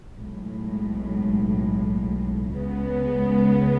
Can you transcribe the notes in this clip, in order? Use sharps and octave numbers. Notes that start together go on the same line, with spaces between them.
B1 A2 G#3
C#2 C#3 G#3 B3